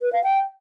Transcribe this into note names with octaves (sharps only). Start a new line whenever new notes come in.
B4
F5
G5